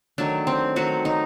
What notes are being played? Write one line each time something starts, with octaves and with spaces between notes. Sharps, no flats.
D#3 F#3 A3 D4
C4
D#3 F#3 A3 F#4
D#4